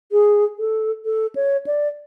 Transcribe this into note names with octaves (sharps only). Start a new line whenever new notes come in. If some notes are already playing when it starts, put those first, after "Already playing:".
G#4
A4
A4
C#5
D5